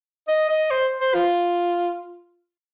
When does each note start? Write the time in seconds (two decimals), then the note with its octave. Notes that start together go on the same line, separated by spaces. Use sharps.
0.28 D#5
0.49 D#5
0.71 C5
1.00 C5
1.14 F4